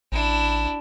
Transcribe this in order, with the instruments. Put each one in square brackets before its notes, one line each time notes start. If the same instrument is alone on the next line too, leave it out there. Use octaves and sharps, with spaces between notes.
[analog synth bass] A1 [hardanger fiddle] D4 E4